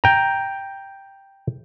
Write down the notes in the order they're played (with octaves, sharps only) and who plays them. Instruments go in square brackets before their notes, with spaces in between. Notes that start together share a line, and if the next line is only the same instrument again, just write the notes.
[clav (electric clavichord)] G5 A#5